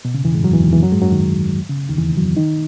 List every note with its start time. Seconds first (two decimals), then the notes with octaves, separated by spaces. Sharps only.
0.05 B2
0.14 C#3
0.24 E2 E3
0.35 G#2 G#3
0.43 F#2 F#3
0.54 E2 E3
0.63 D#2 D#3
0.72 E2 E3
0.82 F#2 F#3
0.92 G#2 G#3
1.02 F#2 F#3
1.11 D#2 D#3
1.69 C#3
1.89 D#2 D#3
1.98 E2 E3
2.17 F#2 F#3
2.37 D#3 D#4